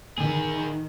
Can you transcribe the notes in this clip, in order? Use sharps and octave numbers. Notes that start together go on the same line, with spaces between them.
D#3 E3 G#4